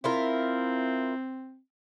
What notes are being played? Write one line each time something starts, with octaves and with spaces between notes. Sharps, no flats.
C4 E4 F4 A#4